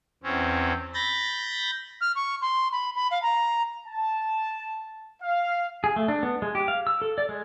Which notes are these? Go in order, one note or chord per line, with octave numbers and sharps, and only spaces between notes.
E2 C4 C#4
B5 G6 A6 A#6
F6
C#6
C6
B5
B5
F5
A#5
A5
F5
G#4
A3
D4
B3
G#3
G4
F5
E6
A4
D5
G#3